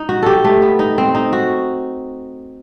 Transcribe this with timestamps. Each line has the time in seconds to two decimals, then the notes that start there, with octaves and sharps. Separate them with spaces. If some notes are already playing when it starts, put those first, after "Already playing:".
Already playing: D#4
0.09 F#4
0.22 G4 A4
0.44 A3
0.62 B3
0.79 D#4
0.98 C4
1.15 D#4
1.33 F#4